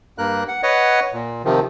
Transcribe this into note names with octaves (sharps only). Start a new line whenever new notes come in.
G2 A#3 A#4 F#6
F#5
B4 C#5 D#5 F#5
A#2
C3 D#3 F3